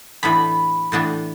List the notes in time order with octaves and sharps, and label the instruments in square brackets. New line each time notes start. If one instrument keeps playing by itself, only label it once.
[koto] A2 E3 B3 D4 [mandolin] B5
[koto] A2 E3 B3 D4